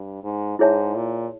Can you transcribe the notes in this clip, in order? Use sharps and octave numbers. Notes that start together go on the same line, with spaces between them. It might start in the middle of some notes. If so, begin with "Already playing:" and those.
Already playing: G2
G#2
G#2 E4 G#4 C#5 E5 A5
A#2